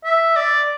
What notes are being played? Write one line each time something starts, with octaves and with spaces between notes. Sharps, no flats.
E5
D5